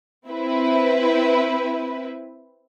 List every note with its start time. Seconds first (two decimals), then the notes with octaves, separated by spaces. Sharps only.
0.28 C4 E4 B4